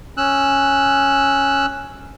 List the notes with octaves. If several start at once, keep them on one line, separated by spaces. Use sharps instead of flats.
C#4 E6 F#6